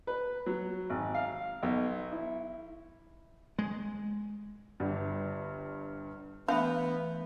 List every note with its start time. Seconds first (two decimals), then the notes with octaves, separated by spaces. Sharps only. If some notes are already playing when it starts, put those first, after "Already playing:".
0.07 B4
0.46 F#3
0.90 G#1
1.15 F5
1.63 B1
2.12 E4
3.59 G#3
4.80 G1 G2
6.48 E3 A3 B3 D4 E5 F5 B5